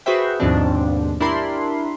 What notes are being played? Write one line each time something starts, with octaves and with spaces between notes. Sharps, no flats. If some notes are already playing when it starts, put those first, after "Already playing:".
F#4 G#4 B4 C5 E5 G5
D#2 G#2 B2 F3 C4 D4
D4 E4 G4 A#4 B5 C6